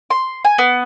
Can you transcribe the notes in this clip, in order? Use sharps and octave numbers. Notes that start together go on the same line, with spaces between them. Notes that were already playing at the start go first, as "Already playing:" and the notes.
C6
G#5
B3